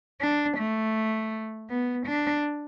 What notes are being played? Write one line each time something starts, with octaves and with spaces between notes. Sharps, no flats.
D4
A3
B3
D4